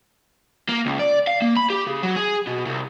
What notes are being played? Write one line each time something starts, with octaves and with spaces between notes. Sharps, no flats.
A#3
C#2
D5
F5
A#3
B5
G4
C#3
F#3
G#4
B2
C2